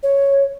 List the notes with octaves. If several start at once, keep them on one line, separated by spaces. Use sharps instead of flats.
C#5